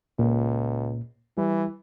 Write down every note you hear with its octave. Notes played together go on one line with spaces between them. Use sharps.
C#2 A#2
E3 G3